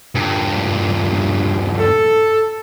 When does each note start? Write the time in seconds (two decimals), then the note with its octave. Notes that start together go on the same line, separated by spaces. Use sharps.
0.15 G2 A#2
1.79 A4